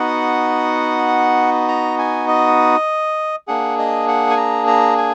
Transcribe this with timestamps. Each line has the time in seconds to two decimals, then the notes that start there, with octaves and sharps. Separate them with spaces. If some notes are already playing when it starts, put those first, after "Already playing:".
Already playing: B3 D#4 F#4 F#5
1.68 A#5
1.98 G#5
2.28 D#5
3.48 A#3 D4 G#4 F#5
3.79 D#5
4.08 F#5
4.30 G#5
4.37 A#5
4.67 A#5
4.98 G#5